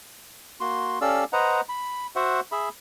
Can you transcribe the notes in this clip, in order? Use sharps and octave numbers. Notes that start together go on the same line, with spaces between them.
A#3 F#4 C6
C#4 G4 A4 D5 F5 E6
B4 C5 D#5 F#5 A#5
B5
F#4 C5 E5 F#5
G#4 E5 B5